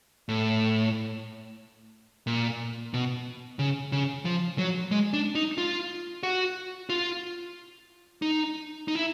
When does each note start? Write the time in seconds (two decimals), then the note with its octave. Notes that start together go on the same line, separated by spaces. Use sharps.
0.29 A2
2.27 A#2
2.94 B2
3.59 C#3
3.92 C#3
4.25 F3
4.58 F#3
4.91 G#3
5.13 D4
5.35 D#4
5.58 F4
6.23 F#4
6.90 F4
8.22 D#4
8.88 D#4
8.95 E4